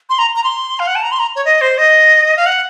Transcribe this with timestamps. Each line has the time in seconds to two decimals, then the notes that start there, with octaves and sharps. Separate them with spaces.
0.10 C6
0.19 A#5
0.36 A#5
0.44 C6
0.80 F5
0.87 F#5
0.96 A5
1.03 A#5
1.12 C6
1.19 A#5
1.36 C#5
1.45 D#5
1.61 C5
1.78 D#5
2.37 F5
2.46 F#5